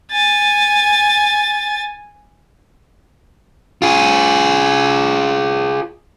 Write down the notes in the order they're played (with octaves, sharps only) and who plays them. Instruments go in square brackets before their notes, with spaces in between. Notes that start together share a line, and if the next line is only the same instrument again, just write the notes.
[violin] G#5 A6
[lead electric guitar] F4 G#4